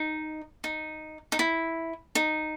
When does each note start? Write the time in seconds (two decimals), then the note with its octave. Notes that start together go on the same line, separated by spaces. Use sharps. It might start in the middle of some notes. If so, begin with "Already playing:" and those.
Already playing: D#4
0.64 D#4
1.32 D#4
1.39 E4
2.15 D#4